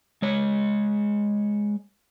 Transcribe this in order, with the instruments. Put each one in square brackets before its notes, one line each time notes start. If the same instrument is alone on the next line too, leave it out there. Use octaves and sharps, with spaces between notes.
[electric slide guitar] G#3 C#5